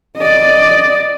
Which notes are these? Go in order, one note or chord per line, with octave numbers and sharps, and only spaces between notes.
D5 D#5